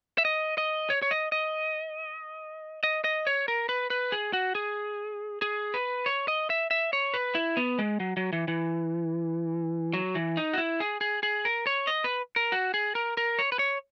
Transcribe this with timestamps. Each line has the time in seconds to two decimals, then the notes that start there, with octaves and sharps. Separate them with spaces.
0.18 E5
0.25 D#5
0.58 D#5
0.90 C#5
1.02 C#5
1.11 D#5
1.32 D#5
2.83 D#5
3.04 D#5
3.27 C#5
3.48 A#4
3.69 B4
3.90 B4
4.12 G#4
4.33 F#4
4.55 G#4
5.42 G#4
5.74 B4
6.06 C#5
6.28 D#5
6.50 E5
6.71 E5
6.93 C#5
7.14 B4
7.35 E4
7.57 B3
7.79 G#3
8.00 F#3
8.17 F#3
8.33 E3
8.48 E3
9.93 F#3
10.15 E3
10.37 D#4
10.53 F#4
10.58 E4
10.80 G#4
11.01 G#4
11.23 G#4
11.45 A#4
11.67 C#5
11.87 D#5
12.04 B4
12.36 A#4
12.52 F#4
12.74 G#4
12.95 A#4
13.17 A#4
13.39 C#5
13.52 B4
13.59 C#5